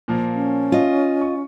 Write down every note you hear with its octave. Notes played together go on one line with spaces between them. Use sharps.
A#2 F3 A#3
C#4
F4 D#5
C#6